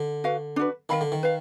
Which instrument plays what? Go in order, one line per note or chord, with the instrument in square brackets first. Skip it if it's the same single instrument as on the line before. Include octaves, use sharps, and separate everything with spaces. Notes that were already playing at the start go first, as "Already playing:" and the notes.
Already playing: [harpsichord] D3
[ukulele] F#4 B4 F5
D4 F#4 B4
[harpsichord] D#3 [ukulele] A#4 F5 B5
[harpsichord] D3
D#3
[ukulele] B4 F5